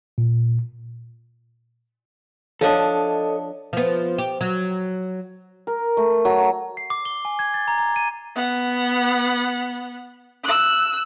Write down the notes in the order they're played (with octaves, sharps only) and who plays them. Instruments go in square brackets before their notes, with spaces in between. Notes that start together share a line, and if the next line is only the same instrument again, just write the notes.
[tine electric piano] A#2
[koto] F3 D4 [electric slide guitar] A4 C#5 D#5
[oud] F3 B3
G4
F#3
[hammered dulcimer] A#4
A3
F#3
[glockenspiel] C7
D6
G7
G#5
G#6
A6
A#5
A#5
D#7
[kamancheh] B3 F#5
E6 F#6